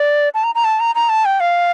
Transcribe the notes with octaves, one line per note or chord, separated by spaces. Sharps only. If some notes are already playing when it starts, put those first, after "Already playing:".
Already playing: D5
A5
A#5
A#5
A5
A#5
A#5
A5
G5
F5